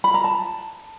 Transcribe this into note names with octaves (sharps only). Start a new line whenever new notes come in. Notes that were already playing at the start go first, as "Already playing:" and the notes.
B5
A#5
A5